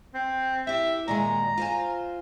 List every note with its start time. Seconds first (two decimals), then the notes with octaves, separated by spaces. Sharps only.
0.15 C4
0.67 E4 G4 E5
1.08 A#2 D#3 G#3 A#5
1.58 F4 C5 G#5